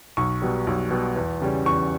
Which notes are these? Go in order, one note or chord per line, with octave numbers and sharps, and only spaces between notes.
B1 C#6
B2 G3
B1
B2 G3
E2
C#3 G3 C#4
E2 C#6